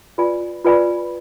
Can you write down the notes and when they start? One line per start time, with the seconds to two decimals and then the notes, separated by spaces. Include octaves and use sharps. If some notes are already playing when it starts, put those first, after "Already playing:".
0.18 F4 B4 D5 G#5 B5
0.65 F4 B4 D5 G#5 B5